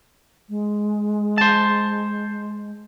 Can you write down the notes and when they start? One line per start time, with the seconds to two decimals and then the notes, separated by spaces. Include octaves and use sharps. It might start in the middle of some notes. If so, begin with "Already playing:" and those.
0.49 G#3
1.38 C5 A5